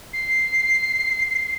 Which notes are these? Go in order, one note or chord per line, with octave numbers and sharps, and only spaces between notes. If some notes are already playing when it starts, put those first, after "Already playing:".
C7